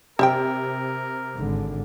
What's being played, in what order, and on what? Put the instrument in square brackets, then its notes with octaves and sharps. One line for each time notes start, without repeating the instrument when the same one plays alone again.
[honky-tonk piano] C3 [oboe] A#4 [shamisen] C5 E5 G5
[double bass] G#1 D3